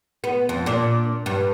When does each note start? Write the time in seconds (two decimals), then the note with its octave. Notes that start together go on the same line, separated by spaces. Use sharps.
0.24 B3
0.49 F2
0.66 A#2 D4
1.26 G2